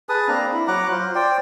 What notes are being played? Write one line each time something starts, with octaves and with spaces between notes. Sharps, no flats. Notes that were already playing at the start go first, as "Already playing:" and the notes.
G#4 B4 A5 D#6
A#3 C4 D4 A#5
E4
F#3 F#5 A#5 D6
F4 C5
C5 D5 G5